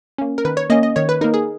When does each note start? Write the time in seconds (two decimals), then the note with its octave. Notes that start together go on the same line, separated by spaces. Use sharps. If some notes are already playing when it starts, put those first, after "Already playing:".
0.18 A#3 C#4
0.38 A#4
0.45 D#3 B4
0.57 C#5
0.70 A#3 C#4 D#5
0.83 D#5
0.96 D#3 C#5
1.09 B4
1.21 D#4 A#4
1.24 A#3
1.34 G#4